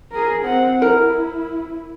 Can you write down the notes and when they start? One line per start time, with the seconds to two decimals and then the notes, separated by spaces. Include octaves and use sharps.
0.11 G#4 A#4
0.42 C4 F#5
0.82 E4 A#4